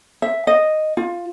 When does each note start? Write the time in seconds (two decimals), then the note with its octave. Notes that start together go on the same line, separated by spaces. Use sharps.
0.22 E5
0.47 D#5
0.97 F4